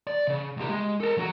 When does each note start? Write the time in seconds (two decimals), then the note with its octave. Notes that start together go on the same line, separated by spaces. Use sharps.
0.07 D5
0.27 C#3
0.57 C#2 G4
0.69 G#3
1.00 A4 A#4
1.17 F#3 F#4